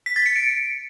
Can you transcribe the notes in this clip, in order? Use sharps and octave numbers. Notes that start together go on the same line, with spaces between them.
B6
A6
C#7
D7